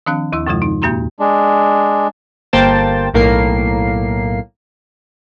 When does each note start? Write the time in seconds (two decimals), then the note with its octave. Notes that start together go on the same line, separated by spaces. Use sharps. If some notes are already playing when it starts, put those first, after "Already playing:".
0.06 D#3 F3 C4 D4 F5 F#6
0.32 D#2 E4 C6 E6
0.46 F#2 C3 D#3 F3 G#3 F4
0.62 D#4
0.82 E2 A#2 A#3 F#4 A#5 C6
1.20 G#3 D4
2.53 G1 A#3 C5 G5 A5 A6
3.14 B1 A2 A#3 A#4 C7